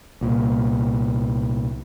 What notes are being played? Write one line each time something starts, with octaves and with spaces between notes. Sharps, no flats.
C2 A#2